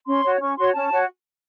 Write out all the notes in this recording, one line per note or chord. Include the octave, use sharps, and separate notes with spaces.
C#4 C6
F#4 C#5
C#4 C#6
F#4 C#5 C6
C#4 A5
F#4 C#5